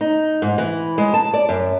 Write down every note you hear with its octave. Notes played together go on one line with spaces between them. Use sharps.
D#4
G#2
E3
G#3
A5
D5
F#2